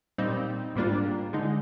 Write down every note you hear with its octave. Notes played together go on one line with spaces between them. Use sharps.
A#2 G3 C4 D#4
G#2 G3 A#3 D4 F4
D3 G#3 D#4